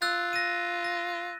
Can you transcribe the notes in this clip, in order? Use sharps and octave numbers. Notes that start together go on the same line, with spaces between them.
F4 E6 F#6 A6
A#6 D#7
A#6